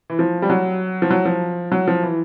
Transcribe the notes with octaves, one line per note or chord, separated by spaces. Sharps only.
E3
F3
G3
F#3
F3
F#3
F3
F#3
F3
E3